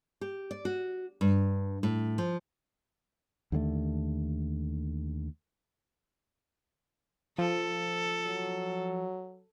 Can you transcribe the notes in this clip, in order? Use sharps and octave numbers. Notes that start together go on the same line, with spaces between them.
G4
D5
F#4
G2
A2
F3
D#2 D3 G#3 A3
F3 A4
F#3